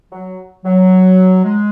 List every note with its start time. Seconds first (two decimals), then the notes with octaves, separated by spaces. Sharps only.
0.12 F#3
0.65 F#3
1.44 G#3